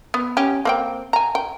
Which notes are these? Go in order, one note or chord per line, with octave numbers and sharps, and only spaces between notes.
B3
C#4 G4
A#3 C4 G5
G#5 A#5
G5